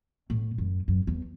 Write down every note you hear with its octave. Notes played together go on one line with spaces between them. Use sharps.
A2
F#2
F#2
E2